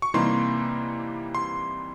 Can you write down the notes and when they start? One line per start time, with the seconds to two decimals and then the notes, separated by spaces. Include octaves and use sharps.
0.02 C#6
0.14 C3 E3 G3 A#3 D#4 C6
1.35 C6